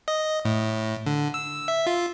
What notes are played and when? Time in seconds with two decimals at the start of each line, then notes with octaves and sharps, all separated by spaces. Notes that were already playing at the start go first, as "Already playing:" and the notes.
0.08 D#5
0.45 A2
1.07 D3
1.34 E6
1.68 E5
1.87 F4